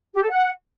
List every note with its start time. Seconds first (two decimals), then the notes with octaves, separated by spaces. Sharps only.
0.13 G4
0.21 A4
0.29 F#5